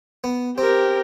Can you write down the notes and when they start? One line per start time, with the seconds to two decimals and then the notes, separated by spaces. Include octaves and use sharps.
0.24 B3
0.58 C4 G4 A#4